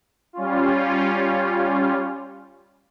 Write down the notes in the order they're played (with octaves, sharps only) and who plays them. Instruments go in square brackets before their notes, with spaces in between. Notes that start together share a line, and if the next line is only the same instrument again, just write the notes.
[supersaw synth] G3 C#4 F4